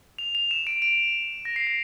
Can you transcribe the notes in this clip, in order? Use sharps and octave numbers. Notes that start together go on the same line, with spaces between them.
F7
F7
E7
D7
D7
A#6
C7
C7